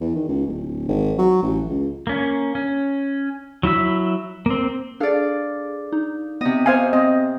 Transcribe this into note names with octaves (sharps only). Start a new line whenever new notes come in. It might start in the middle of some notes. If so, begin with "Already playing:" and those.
E2
D#3
C#2
D1
G#1
F#3
A1
C#2
A#3 C#4
C#4
F#3 E4 E5 E6
A#3 C4
D4 G#4 A4 D5 F5
D#4
C3 B3 D#5
C5 F5 G#5
C4 D#5